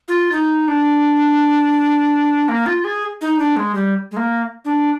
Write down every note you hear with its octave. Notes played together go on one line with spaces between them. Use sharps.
F4
D#4
D4
A#3
F4
G#4
D#4
D4
G#3
G3
G#3
A#3
D4